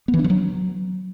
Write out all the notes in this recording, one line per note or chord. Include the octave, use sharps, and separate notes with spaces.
B3
E3
D4
F3
F#3